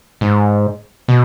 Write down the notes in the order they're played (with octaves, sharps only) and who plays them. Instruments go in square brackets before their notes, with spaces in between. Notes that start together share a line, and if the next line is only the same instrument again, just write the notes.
[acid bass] G#2
B2